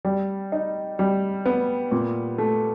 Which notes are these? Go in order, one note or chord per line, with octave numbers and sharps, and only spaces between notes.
G3
D#4
G3
B3
A#2
A3